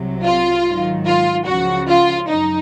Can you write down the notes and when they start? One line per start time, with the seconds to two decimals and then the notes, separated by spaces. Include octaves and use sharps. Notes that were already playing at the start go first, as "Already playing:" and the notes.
Already playing: C2 C3 F#3
0.24 F4
0.66 G#2 D#3 F#3
1.06 F4
1.47 C#2 C#3 F3 F#4
1.89 F4
2.29 F#2 D#4